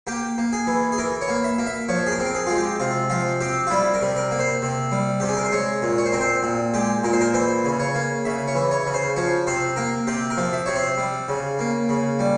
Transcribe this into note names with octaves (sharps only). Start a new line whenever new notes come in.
A#3 G4
A#3
G#4
E3
G#4
E3 A#4
C#5
A#3
E5
A#3
E5
F3 C#5
G#4
A#4
C4
A#4
G#4
G#3 F4
G4
C3 F4
F3 F4
C4 G4
F4
G3 E4
A#4
C3
A#4
A#3
C5
C3
G3
C3 G4
G#4
A#4
C5
G#3 C#5
A#2
C#5
C5
C4 A#4
C5
A#2
G#3 G4
A#2 A#4
C5
A#4
E3 C5
C#3
C#5
A#3
C#3 E5
C#5
E3
C#5
C#3
C5
F3 C#5
C3 C5
A#3 A#4
C3 G4
A#4
F3
E5
C3 C#5
C5
G3
C#3
A#3
C#3
G3